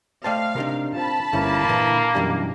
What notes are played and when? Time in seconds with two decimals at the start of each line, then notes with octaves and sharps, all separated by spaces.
0.24 A3 C5 D5 D#5 F5 G5 A5
0.56 C3 D4 D#4 A#4
0.95 C4 F4 A5 B5
1.33 G1 D2 A#3 C#4 E4 C#5
1.69 A#2 D3 E3
2.15 F#2 B2 E3 G3 D4 G4